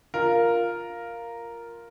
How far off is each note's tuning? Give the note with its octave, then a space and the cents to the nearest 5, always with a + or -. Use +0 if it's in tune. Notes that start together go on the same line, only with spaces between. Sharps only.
F4 +0 A#4 +0